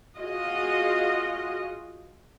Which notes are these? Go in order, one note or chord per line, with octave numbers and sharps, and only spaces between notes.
F4 F#4 G#4 D#5